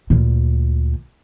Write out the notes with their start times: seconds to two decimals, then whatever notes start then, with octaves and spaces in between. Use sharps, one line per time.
0.10 D2 A#2